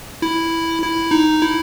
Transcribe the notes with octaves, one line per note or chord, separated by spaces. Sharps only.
E4
E4
D#4
E4